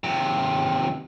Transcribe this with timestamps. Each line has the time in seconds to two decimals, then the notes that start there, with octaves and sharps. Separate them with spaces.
0.04 D#2 C3